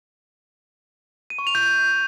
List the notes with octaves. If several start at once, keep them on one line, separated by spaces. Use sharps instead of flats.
D#7
C#6
F7
G6